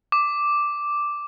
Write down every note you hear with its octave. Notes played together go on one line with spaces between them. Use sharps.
D6